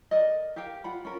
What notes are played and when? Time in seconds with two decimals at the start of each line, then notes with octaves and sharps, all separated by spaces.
0.11 A#4 D5 D#5
0.56 G4 A#4 F5 G5
0.84 F4 F#5 B5
1.05 C#4 F4 A#4